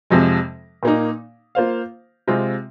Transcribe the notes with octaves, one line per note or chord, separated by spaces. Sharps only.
F2 C3 F3 G#3
A#2 A#3 D#4
A#3 F4 C5 F5
C3 G#3 C4 F4